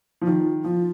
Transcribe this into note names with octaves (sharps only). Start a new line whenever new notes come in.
F3
D#3 F4
F3 F4